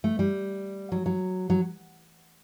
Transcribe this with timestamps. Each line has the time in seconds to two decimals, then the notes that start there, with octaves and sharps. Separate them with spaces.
0.04 A3
0.19 G3
0.92 F#3
1.06 F#3
1.50 F#3